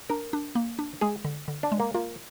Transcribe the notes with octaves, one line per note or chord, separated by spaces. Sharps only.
D4 A#4
D4
A#3
D4
G#3 G#4
D3
D3
D4
G#3
A#3
A#3 F4